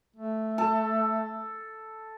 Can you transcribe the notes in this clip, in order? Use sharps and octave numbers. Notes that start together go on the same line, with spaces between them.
A3
A4